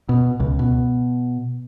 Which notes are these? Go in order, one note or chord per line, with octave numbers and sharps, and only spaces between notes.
B2
C#2
B2